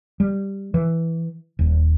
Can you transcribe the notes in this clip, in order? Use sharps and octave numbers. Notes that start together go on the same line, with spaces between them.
G3
E3
D#1